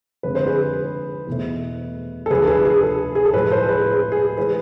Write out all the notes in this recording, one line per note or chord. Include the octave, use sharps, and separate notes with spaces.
F2 D3 G#3 B4
C5
G#4 B4
E2 B2 A3
A4
D2 D3 F3 G#4 B4
A4
G#4 B4
G#4
A4
G#4
A4
A2 F3 G#3 G#4 B4
A4 C5
G#4 B4
G#4
G#4
E3 G#3 G#4 B4